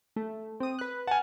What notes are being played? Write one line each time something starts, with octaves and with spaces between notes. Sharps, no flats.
A3
C4 D#6
B4 F#6
F#5 G#5 A5 F6